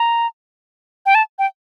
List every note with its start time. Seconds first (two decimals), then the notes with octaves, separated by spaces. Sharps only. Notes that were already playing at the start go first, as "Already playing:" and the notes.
Already playing: A#5
1.06 G5
1.15 A5
1.39 G5